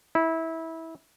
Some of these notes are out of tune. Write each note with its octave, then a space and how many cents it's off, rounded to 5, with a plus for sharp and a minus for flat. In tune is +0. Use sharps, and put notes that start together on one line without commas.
E4 -20